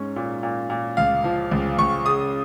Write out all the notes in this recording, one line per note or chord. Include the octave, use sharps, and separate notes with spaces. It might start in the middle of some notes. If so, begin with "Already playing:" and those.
Already playing: G#2 C#4
A#2
A#2
A#2
C#2 F5
F3
C#2
C#2 C#6
C#3 D#6